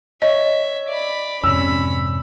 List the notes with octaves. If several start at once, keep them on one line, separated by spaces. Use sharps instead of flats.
C#5 D#5 E5
D5 B5
F2 G#2 C3 C#4 B5 E6